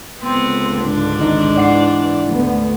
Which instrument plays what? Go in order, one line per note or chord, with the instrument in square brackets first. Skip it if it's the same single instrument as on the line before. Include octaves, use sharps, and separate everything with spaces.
[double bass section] C#2 D3 [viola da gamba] B3 C4
[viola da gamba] G#2 D4
[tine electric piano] G#1 D#4 D#5
[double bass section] E3 [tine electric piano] D5 F#5 C7
[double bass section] G#1 D2 B3